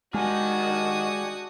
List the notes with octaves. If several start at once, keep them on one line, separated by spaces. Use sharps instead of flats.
D#3 G#3 D4 F#4 G4 G#5 D#6